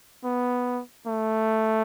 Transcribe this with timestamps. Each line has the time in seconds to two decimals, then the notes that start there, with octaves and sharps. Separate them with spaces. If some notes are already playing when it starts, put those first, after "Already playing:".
0.24 B3
1.07 A3